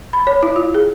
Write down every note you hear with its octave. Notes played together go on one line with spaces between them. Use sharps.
B5
C#5
E4
F4
G#4